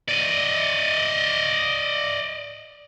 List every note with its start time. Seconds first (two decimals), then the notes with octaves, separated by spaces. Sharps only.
0.09 D5 D#5